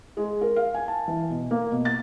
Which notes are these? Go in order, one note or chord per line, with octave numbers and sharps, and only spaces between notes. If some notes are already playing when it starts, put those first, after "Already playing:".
G#3
A#4
F5
G#5
A5
E3
B2
A#3
B2
A6